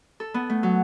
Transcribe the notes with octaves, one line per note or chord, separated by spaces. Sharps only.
A4
B3
A3
F#3